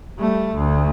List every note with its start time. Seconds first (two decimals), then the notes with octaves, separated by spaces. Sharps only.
0.19 G3 A3
0.55 D2